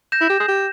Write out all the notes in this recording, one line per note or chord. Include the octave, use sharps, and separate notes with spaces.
G6 A#6 E7
E4
G4
G#4
G4